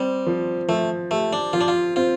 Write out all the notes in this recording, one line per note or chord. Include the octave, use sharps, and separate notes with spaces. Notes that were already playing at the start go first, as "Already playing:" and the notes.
Already playing: G3 C4
F3
F3 A3
A3 G4
D4
F3 F4
D4
F4
C4 F4